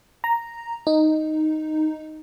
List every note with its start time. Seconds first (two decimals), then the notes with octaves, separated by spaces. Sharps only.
0.24 A#5
0.87 D#4